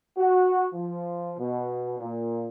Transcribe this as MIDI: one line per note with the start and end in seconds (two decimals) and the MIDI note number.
0.18 0.67 66
0.74 1.32 53
1.39 1.95 47
2.00 2.46 46